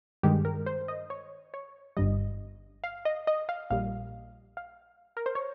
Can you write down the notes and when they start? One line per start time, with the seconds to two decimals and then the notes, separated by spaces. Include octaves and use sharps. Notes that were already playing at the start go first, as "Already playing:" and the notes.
0.23 G2 D#3 G#3 G4
0.45 A#4
0.66 C5
0.88 D#5
1.10 C#5
1.54 C#5
1.97 G1 G2 G3 D#5
2.84 F5
3.05 D#5
3.27 D#5
3.49 F5
3.70 A#1 A#2 G3 F5
4.57 F5
5.17 A#4
5.26 C5
5.35 C#5